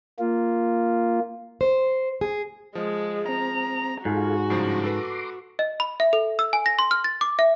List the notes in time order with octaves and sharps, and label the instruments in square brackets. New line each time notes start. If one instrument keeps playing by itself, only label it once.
[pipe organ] A#3 F4
[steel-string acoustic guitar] C5
G#4
[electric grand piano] F3 [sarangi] G#3
[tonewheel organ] C4 [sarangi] A#5
[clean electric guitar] G#2 [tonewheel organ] F4 G#4 A4 [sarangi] F#4
[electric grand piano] G2 C#3 F3 [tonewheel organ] A#5 C6 D6
[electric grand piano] A4 B4
[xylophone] D#5
B5
E5
A4
E6
G#5
A#6
C6
F6
A6
D6
E5